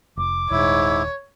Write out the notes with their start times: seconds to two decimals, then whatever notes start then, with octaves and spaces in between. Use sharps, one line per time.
0.17 F1 D6
0.51 D#1 G#2 E4 C#5